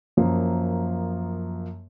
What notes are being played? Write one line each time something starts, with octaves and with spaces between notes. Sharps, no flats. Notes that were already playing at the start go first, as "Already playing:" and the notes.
F#2 F3 A#3